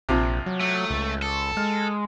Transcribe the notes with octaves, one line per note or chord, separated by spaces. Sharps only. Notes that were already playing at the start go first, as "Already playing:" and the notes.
A#1 C3 F3
F#3
A3
C#2
A4
G#3 F6